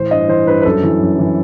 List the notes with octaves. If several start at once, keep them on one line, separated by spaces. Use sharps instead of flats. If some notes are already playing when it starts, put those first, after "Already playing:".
Already playing: A2 E3 C5
G2 D#5
E3 C5
G2 B4
B4
F#2 A4
E3
F#2
E3